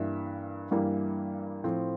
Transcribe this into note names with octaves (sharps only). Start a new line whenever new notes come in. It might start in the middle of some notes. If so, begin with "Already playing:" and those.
Already playing: G2 E3 G3 A#3 E5
G2 E3 G3 A#3
A2 F3 C4